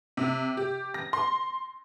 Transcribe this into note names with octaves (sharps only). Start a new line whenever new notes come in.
C3
G4
A#6
C6